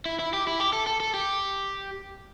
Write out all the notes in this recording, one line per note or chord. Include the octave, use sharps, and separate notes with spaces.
E4
E4
G4
E4
G4
A4
A4
A4
G4